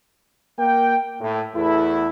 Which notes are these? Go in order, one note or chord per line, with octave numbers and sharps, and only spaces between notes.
A#3 G5
A2
E2 A3 E4